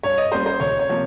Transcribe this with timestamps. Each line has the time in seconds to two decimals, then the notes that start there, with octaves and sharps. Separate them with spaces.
0.03 G2 C#5
0.18 D#5
0.32 G3 A#3 C#4 C5
0.46 C5
0.60 C#2 C#5
0.79 C#5
0.89 C3 F3 A#3